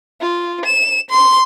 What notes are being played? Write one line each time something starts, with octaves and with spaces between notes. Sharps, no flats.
F4
E7
C6